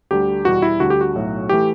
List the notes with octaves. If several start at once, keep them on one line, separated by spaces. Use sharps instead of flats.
D2 D3 G3 G4
E2 B2 G3 F#4
E4
D2 D3 G3 F#4
G4
F#4
B1 A2 F#3
E3 A3 G4